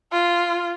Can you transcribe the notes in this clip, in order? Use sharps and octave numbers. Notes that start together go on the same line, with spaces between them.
F4